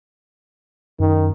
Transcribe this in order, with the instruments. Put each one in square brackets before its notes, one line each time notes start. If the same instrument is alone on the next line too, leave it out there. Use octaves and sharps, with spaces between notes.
[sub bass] F#2 [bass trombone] D#3